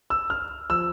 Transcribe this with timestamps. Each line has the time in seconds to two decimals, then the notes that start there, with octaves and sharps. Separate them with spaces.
0.10 E6
0.30 F6
0.70 F3 E6